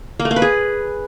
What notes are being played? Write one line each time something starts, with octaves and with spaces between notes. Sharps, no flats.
A#3
A3
A#3
B4
G#4